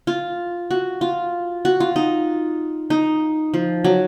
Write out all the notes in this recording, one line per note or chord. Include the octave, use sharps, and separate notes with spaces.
F4
F#4
F4
F#4
F4
D#4
D#4
F3
F#3